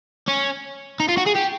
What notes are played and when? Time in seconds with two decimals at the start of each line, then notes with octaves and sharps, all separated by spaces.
0.28 C#4
1.00 D#4
1.09 F4
1.17 F#4
1.26 G#4
1.35 G4